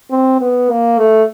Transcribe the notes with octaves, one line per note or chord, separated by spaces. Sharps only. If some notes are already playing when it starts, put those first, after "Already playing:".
C4
B3
A#3
A3